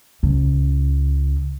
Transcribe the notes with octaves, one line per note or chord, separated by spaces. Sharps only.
C#2